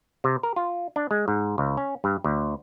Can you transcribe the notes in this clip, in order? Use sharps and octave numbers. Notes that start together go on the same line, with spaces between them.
C3
A#4
F4
D4
G#3
G#2
C#2
C#4
G2
D2